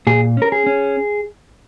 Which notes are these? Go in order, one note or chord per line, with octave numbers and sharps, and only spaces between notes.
A#2 G#4
C#4 A#4
G#4
C#4